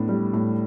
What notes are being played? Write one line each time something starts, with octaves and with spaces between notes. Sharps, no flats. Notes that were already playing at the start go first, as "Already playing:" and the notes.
Already playing: A2 B3 D4
G3
A2